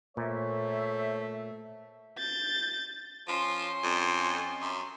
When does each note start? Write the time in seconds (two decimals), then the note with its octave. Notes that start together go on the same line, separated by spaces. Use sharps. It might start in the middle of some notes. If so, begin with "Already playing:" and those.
0.17 A#2 A3 C5 C#5 E5
2.18 G6 A6
3.28 F3 C#4 C6
3.83 F2
4.61 F#2